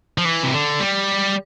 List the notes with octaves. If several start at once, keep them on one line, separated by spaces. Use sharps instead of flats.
F3
E3
C3
D3
G3